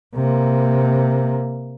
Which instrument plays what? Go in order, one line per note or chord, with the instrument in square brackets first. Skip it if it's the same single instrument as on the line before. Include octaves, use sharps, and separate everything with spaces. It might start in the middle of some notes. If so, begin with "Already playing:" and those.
[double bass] C3 A#3